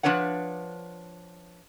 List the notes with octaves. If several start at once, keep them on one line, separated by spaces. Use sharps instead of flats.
F3 G3 D4 B4 C#5 F#5